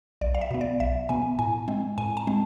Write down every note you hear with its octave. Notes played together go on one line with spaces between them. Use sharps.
B1 D5
F5
E5
B2 B3
D5
B1 E5
B2 B3 G#5
A2 G#5
G#3 C4
A2 G#5
A5
G#3 C4